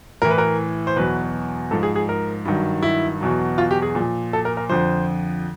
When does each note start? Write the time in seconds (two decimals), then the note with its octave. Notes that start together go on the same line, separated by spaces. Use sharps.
0.22 A2 E3 A#4
0.30 B4
0.38 A#4
0.87 C5
0.96 E2 B2 F#3 B4
1.71 G#2 F3 A4
1.83 G#4
1.96 G#4
2.09 A#4
2.45 G2 D#3 F#3
2.83 E4
3.21 E2 B2 F#3
3.58 F4
3.71 G4
3.82 G#4
3.95 A#2
4.00 F3
4.33 A4
4.45 A#4
4.57 A#4
4.69 F2 D3 F3 C5